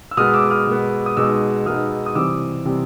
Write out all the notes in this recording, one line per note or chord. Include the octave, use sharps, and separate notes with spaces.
E6
B2 G#3 B3 D#6 F6
D6 E6
D#6 F6
B2 G#3 B3
D#6
B2 G#3 B3 D#4 D6 E6
B2 G#3 B3 D#4 D#6 F6
D#6
C3 E3 G3 C4 D6 E6
C3 E3 G3 C4